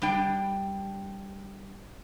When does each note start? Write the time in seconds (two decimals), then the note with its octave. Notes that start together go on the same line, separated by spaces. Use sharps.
0.02 G3 D4 G5